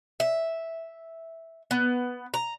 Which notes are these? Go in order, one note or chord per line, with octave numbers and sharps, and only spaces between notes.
E5
B3
A#5